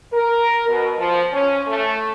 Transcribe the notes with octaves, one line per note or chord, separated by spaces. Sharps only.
A#4
B2
F3
C#4
A3